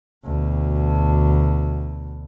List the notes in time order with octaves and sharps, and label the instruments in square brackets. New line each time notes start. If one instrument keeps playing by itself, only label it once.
[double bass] D2 B2